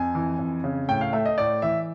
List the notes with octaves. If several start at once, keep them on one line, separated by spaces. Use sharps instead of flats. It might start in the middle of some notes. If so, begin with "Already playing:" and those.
Already playing: F2 G#5
E3
F2
C#3
A2 G5
F5
A3 E5
D#5
A2 D5
E3 E5